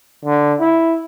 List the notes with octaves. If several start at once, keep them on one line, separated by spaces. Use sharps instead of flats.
D3
E4